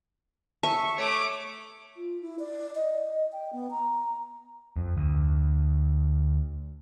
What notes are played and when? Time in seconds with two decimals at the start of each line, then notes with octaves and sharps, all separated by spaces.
0.63 E5 A5 C#6
0.98 A3 C#5 D6
1.96 F4
2.22 E4
2.39 D5
2.75 D#5
3.32 G5
3.53 B3
3.70 A#5
4.77 F2
4.97 D2